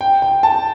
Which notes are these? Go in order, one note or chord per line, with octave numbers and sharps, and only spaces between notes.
G5
G5
A5